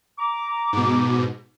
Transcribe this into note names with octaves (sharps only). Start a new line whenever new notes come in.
A#5 D6
G#2 B2